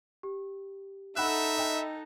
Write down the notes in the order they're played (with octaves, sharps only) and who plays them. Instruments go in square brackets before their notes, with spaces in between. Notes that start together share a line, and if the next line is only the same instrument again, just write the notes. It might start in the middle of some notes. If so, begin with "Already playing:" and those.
[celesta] G4
[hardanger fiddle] D#4 A4 [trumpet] E5 [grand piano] F#5 E6 F#6 [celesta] B5 E7
[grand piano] D#5 G5